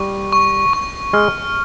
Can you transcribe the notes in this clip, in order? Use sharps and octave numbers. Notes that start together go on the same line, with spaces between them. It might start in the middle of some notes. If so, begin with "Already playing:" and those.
Already playing: G3 C#6
C#6
C#6
G#3 F6